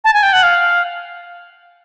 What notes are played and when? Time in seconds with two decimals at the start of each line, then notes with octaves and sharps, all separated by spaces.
0.04 A5
0.14 G#5
0.23 G5
0.33 F#5
0.43 F5